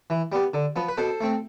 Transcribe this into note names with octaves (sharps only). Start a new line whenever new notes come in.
E3
G3 B3
D3
F3 B3
B4
B2 A4 C5
A3 C4